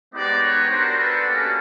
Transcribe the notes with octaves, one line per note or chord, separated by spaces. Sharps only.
G#3 B3 D#4 G4 C5 D5
B4 C#5
B3 D4 F#4 A#4 C5
A4 B4
A#3 C#4 F#4 G4 A4